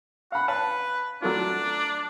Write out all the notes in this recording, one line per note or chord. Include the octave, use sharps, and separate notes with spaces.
F5 F#5 B5
B4 C#5 F5 A5
F#3 A3 D4 F4